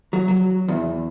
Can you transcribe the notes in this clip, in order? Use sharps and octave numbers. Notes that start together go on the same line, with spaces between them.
F#3
F#3
E2